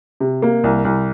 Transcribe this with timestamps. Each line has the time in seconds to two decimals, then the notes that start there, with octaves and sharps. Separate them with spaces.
0.20 C3
0.42 A#3
0.64 C2
0.85 C2